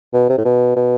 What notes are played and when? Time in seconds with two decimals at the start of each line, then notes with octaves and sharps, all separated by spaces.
0.13 B2
0.29 C3
0.38 A2
0.45 B2
0.76 B2